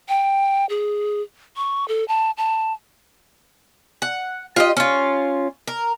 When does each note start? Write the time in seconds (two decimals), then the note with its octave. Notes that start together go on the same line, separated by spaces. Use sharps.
0.09 G5
0.69 G#4
1.57 C#6
1.88 A4
2.08 A5
2.37 A5
4.02 F#5
4.56 F4 G4 D#5
4.77 C#4 F4
5.68 A#4